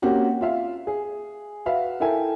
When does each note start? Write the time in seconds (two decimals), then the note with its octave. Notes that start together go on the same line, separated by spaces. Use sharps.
0.02 A#3 C4 C#4 F#4 G4
0.41 F4 E5 F5
0.87 G#4
1.66 F#4 B4 E5 F5
2.00 E4 A4 A#4 E5 G5 G#5